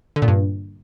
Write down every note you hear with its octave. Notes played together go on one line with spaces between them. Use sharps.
D3
A#2
G2